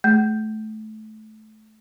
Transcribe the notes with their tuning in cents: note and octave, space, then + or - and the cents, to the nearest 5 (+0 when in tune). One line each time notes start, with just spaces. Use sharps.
A3 -20